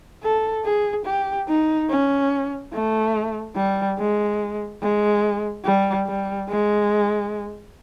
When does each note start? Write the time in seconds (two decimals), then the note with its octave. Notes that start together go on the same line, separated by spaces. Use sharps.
0.24 A4
0.65 G#4
1.06 G4
1.49 D#4
1.90 C#4
2.73 A3
3.56 G3
3.99 G#3
4.82 G#3
5.65 G3
6.06 G3
6.49 G#3